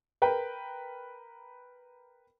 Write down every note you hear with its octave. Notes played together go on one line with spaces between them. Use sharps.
A#4 B4 G5